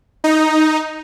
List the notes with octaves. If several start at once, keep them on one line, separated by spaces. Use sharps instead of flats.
D#4